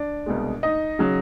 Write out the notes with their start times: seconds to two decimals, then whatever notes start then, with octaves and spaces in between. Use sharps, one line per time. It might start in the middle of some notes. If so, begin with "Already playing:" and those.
Already playing: D4 D5
0.26 C2 B2 G#3
0.63 D#4 D#5
0.99 C#3 F#3